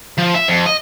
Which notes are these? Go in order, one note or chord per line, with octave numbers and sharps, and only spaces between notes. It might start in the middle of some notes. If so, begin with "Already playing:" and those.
F3
E5
F2
D#5